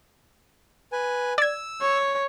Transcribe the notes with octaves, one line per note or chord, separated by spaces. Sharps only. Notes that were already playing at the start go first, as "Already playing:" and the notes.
B4 G#5
D5 E6 G#6
C#5